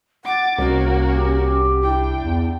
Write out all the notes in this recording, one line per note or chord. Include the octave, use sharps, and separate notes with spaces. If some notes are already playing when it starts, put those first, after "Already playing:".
F#5 D6 A6
C2 A#3 C#4 F#4
G4
D4 E4 G5
E2